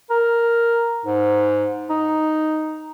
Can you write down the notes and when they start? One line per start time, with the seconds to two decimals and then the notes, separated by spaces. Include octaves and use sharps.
0.11 A#4
1.06 G#2
1.90 D#4